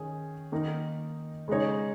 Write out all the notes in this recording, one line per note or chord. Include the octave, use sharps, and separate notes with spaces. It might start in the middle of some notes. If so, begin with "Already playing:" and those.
Already playing: D#3 C#4 G#4
D#3 A#3 D#4 A#4
C#3 G#3 D#4 C#5